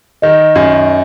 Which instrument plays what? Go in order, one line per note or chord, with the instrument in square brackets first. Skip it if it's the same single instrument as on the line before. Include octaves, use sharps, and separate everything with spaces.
[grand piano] D#3 [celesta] D#5
[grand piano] F#2